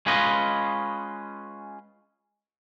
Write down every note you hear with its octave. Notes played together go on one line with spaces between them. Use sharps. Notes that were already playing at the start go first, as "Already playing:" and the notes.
G#3 C#4 F4 B4 D#5